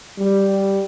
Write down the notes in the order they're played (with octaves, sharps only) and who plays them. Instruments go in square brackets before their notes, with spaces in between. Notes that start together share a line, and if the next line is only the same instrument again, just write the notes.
[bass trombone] G3